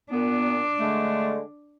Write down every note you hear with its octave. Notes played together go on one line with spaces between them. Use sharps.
A#2 B3 D4
D3 G#3 A3